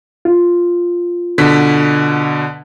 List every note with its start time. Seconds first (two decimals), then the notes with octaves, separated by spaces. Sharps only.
0.25 F4
1.38 B2 D3 B6